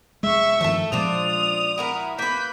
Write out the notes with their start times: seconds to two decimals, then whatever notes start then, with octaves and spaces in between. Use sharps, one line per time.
0.23 F1 G#3 E5 C#6
0.61 G2 D#3 F3 A3 A4
0.92 A#2 F3 G#3 D4 F4 C5 D#6 F7
1.78 E4 F#4 A#4
2.19 A#3 B4 G6 B6